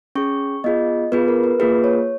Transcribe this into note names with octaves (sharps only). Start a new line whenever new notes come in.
C#4 G#4 C#6
B3 F4 G#4 D#5
B3 F4 G#4 B4
A#4
B4
A#3 F4 G#4 B4
C#5